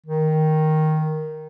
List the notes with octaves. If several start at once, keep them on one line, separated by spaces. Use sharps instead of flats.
D#3